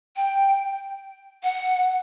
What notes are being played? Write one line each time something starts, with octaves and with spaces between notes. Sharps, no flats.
G5
F#5